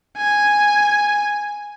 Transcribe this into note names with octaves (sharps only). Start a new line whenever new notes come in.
G#5